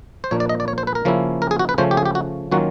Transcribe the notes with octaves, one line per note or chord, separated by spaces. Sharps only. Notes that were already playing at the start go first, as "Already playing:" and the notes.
C5
A#2 F3 A#3 D4 C#5
D5
D#5
D5
C#5
C5
B4
A#4
C#3 F3 A#3 C#4 E4
A#4
G#4
F#4
B4
C#3 F3 A3 C#4 C5
G4
G#4
G4
F#4
D#3 F#3 A#3 C#4 F4 F#4